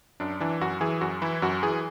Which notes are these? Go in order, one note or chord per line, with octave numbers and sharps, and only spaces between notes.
F#2 D4
E3 D4
F#2 F#4
E3 G#4
F#2 F#4
E3 E4
F#2 F#4
E3 G#4